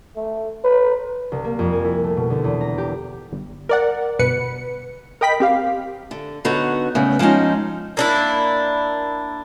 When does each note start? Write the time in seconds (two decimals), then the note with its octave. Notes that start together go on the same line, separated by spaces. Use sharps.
0.16 A3
0.64 B4
1.32 C2
1.44 A#3
1.59 F2
1.73 G#5
1.84 E4
2.04 A3
2.17 B2
2.30 D2
2.44 E2
2.61 A#5
2.78 G4
3.33 G1
3.69 A#4 D5 F#5
4.19 G1 B2 B4 C#7
5.21 A#4 D#5 G5 B5 B6
5.40 C4 G4 F5
6.11 D3
6.45 D3 B3 D#4 F#4 C#5
6.95 A2 C#3 G3 B3
7.19 F3 G#3 C4 C#4 D#4
7.97 A#3 D4 E4